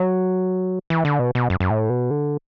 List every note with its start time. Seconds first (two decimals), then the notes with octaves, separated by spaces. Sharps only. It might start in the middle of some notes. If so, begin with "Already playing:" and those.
Already playing: F#3
0.90 E3
1.05 D3
1.19 B2
1.35 B2
1.50 F#2
1.60 F#2
1.70 A2
1.90 B2
2.10 D3